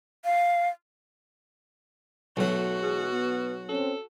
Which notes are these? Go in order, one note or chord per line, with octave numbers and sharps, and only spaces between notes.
F5
B1 F#3 A3 F#4
B2 E3 G#3 G#4
B3
C4 C#4 A4